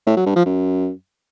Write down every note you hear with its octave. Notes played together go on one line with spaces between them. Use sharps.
A2
F#3
G2
F3
F#2